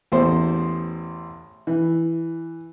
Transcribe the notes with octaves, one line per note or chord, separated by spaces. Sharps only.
A1 E2 C5
E3